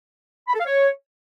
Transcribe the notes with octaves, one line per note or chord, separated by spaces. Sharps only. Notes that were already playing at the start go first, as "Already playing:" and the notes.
B5
A4
F5
C#5